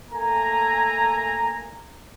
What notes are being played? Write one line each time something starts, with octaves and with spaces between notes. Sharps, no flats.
A3 A#3 G#5 A#5